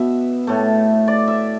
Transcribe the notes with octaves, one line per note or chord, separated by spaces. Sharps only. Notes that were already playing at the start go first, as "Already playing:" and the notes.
Already playing: B2 B3 E5
A2 A3
D5
E5